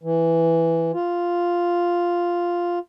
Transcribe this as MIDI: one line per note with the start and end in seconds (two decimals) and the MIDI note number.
0.03 0.92 52
0.94 2.79 65